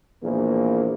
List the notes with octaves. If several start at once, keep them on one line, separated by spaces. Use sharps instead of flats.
A#1 E2 A#3